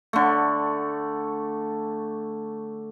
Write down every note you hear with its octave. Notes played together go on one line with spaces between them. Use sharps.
D3 A3